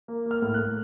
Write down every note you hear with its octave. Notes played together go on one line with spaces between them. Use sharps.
A#3
A#3 F6
A2
A2 F#6